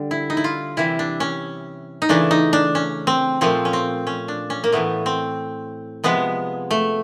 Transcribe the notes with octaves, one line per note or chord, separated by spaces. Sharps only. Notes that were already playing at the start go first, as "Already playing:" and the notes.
Already playing: D3 G3
E4
D#4
E4
F4
C3 E3 G3 E4
D4
C#4
D#4
C#3 E3 A3 D4
D#4
D4
C#4
C4
A#2 F3 A3 C4
C#4
C4
C#4
D4
C#4
A#3
A2 E3 A3 B3
C4
C3 F3 G#3 B3
A3